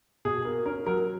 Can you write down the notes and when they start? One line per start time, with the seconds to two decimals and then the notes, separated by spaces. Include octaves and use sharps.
0.25 B2 G#4
0.45 A#3
0.66 C#4 A#4
0.86 F#3 A#4